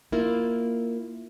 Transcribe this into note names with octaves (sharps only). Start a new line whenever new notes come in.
A#3 E4 F4